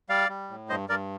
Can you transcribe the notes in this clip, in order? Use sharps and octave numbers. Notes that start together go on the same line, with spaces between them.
G3 D5 F5
G3
A2
G2 C5 D#5
G2 A#4 D5